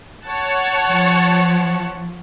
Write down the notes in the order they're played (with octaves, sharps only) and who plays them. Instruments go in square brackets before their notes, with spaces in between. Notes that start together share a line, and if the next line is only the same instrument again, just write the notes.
[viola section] C#5 F#5 A5
[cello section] F3